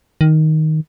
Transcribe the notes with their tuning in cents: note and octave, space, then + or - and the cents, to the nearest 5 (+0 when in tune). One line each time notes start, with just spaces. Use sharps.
D#3 +5